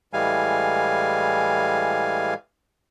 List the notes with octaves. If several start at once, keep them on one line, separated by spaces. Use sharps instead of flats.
A2 E3 G3 G#3 F5 G#5